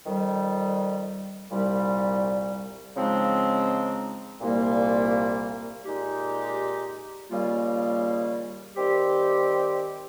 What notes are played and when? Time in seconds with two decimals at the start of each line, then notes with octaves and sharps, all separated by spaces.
0.05 F2 D#3 G3
1.50 C2 A#2 G3
2.95 C#3 F3 G#3 C4 D#4
4.41 C2 A#2 G3 A#3
5.85 A#2 G#3 D#4 G4
7.30 D#2 C#3 G3 A#3 F4
8.75 D#3 G3 C4 G4